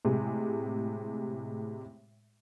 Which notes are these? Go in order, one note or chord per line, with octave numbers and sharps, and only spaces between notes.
A2 C3 G#3